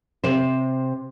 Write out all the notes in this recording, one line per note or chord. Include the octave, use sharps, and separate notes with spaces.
C3 C5